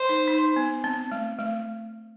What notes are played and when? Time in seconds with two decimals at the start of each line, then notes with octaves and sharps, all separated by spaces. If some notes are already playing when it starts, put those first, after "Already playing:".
Already playing: C5
0.09 D#4
0.28 D#4
0.56 B3
0.84 C4
1.12 A3
1.39 A3